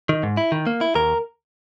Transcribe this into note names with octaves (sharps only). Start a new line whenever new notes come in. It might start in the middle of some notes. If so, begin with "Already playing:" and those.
D#3
G#2
E4
D#3
A#3
E4
D#2 A#4